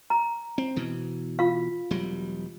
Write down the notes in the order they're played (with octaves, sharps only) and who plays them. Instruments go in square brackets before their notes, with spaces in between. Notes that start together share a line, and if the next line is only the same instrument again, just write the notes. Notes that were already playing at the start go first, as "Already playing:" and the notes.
[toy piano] A#5
[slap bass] C4
B2 E3
[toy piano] F4 F5
[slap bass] E1 F#3 G3